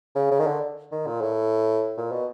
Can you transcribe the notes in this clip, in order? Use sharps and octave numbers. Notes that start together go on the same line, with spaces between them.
C#3
C#3
D#3
D3
D#3
A#2
A2
A#2
B2